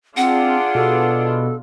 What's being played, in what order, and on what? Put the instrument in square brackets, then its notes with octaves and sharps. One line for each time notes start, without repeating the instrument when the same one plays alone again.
[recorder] C4 [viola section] D4 F4 G#4 [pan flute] F#5
[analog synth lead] B2 [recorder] A4